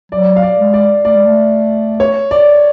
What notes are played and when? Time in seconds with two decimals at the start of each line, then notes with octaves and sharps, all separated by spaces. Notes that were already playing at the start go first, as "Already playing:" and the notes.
0.12 F#3 D5
0.36 F5
0.43 D5
0.59 G#3
0.74 D5
1.05 A3 D5
1.15 G#3
1.25 A3
2.00 C#5
2.31 D5